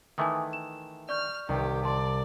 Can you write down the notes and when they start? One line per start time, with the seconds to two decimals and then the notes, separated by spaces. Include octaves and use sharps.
0.18 D#3 E3 A3 G#5 D6 D#6
0.53 E7
1.09 D5 C#6 F6 G6
1.49 C2 D#3 G4
1.85 D5 A5 C6